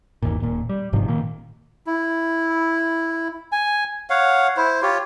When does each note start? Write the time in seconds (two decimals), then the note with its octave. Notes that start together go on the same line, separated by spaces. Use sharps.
0.22 G1 D#2 A#2
0.40 D#1 A#2
0.69 G3
0.93 G1 G#2 C3 F3
1.08 A#2 D#3 A#3
1.87 E4
3.52 G#5
4.10 C#5 F5 F#5
4.57 E4 C5
4.82 F4 G4 C#5